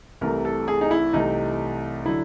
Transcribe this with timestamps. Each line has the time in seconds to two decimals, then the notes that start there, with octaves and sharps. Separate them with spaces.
0.21 C2 C3 E3 A3 A#4
0.45 A4
0.68 G#4
0.81 D#4
0.91 E4
1.13 C2 C3 E3 A3 D#4
2.06 D3 F#3 E4